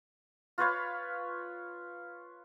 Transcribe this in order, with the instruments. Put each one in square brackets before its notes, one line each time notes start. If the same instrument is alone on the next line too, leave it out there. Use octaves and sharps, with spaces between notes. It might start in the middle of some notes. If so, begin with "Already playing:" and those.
[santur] F4 B4 C#5 F5